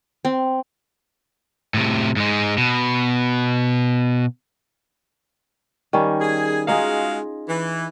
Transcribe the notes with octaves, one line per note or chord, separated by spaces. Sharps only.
C4
A2 C3
G#2 G#3
B2
D#3 G3 C#4
G#4
G#3 D#4 F4 F#4 G#4 F5
E3